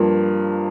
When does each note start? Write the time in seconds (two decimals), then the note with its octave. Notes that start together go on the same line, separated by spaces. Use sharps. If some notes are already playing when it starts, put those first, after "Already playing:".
Already playing: G2 F3 A#3